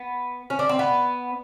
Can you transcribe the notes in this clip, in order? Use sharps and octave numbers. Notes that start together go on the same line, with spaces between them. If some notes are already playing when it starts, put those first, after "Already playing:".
Already playing: B3
C#4
D4
C4
B3